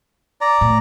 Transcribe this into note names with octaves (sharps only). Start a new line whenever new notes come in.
D5 A#5
A2